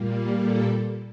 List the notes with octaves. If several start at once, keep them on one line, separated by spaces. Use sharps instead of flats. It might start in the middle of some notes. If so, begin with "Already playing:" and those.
Already playing: A#2 G3 A#3
A4